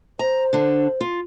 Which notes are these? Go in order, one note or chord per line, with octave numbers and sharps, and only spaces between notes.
C5 A#5
D3 D4
F4